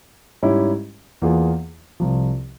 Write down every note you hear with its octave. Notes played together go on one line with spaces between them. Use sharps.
G#2 G3 C#4 E4 G4
E2 E3 A#3 F4 G#4
C2 C3 F3